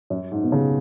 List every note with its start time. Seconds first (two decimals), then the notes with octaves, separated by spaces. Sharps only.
0.10 F#2
0.32 G#2
0.43 B2
0.52 C#3